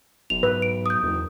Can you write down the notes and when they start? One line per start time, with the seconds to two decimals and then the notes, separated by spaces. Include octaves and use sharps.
0.30 F1 B1 F7
0.43 G#2 B4
0.62 D7
0.86 D#6 G6
1.03 F#1 E2